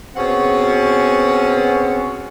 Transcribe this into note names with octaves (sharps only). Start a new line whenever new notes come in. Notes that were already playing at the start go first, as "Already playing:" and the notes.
B2 C4 C#4 G#4 F#5